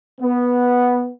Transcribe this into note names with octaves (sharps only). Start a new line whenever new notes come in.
B3